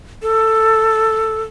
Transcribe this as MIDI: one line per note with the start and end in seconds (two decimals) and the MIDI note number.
0.22 1.42 69